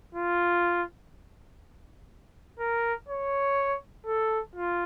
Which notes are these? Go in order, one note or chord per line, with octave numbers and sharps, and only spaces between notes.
F4
A#4
C#5
A4
F4